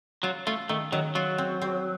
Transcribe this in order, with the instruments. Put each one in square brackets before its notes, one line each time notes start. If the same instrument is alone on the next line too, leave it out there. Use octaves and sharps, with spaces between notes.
[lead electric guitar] F#3 [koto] F4
[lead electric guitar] A3 [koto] F4
[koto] D#3 [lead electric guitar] A3
[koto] D#3 [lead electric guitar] F#3
[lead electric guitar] F#3 [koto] F4
[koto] C4
C4